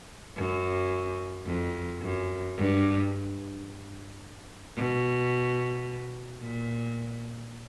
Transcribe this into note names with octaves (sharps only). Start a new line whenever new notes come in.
F#2
F2
F#2
G2
B2
A#2